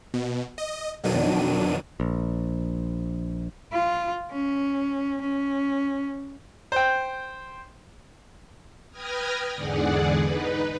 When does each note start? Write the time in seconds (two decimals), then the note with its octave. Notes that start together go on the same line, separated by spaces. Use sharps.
0.14 B2
0.58 D#5
1.04 F2 B2 D#3 F#3 D4 D#7
2.00 A#1
3.73 F4
4.32 C#4
5.21 C#4
6.72 C5 G5
8.91 B4 G5 D#6 F6 G#6 A#6
9.55 E2 G#2 D3 G#4 D5 F#5
10.18 D#4 B4